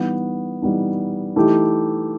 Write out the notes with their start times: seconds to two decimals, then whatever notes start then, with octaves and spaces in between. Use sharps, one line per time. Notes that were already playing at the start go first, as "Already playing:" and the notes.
Already playing: E3 G3 B3 D#4
0.62 E3 G3 B3 D#4
1.36 E3 A3 D#4 G4